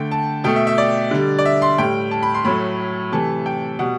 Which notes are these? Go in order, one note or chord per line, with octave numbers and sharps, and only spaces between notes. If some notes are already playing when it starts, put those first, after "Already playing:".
Already playing: D3 A3 G5
A5
B2 A3 G5
E5
E5
D5
D3 G3
D5
E5
C6
A2 G3 G5
A5
B5
C6
A2 F#3 A3 B5
C3 E3 A3 A5
G5
B2 G3 F#5